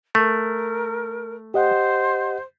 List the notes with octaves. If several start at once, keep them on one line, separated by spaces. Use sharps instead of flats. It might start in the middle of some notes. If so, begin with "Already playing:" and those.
A3 A#4
G4 C5 D#5 F#5